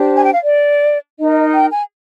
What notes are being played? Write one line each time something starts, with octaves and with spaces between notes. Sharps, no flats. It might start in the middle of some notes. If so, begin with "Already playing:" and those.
Already playing: D4 G4 C5
G#5
G5
F5
D5
D#4 A#4 D#5
G5
G#5